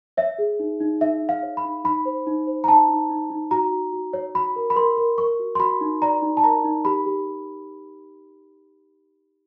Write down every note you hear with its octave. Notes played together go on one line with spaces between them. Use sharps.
C#5 E5
G#4
D#4
D#4
D#4 E5
D#4
F5
C#5
B5
D#4
D#4 B5
C5
D#4
C5
A#5
D#4 A5
D#4
D#4
D#4
F#4 A#5
F#4
F#4
C#5
F#4 B5
A#4
B5
A#4 C6
A#4
A#4 C#6
F#4
C6
F#4 B5
D#4
D5 A#5
D#4
A5
A#4 A#5
D#4
G4 B5
G4
G4